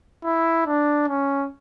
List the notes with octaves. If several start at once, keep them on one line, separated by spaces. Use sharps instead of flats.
E4
D4
C#4